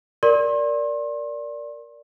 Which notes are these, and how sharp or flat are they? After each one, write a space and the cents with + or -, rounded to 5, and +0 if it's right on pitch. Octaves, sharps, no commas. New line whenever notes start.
A#4 +0 D5 -10 C6 +35